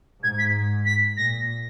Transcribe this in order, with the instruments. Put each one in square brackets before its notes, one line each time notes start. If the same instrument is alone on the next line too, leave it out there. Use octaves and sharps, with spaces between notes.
[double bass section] G#2 [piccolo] G#6
[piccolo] B6
B6
[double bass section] A#2 [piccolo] A#6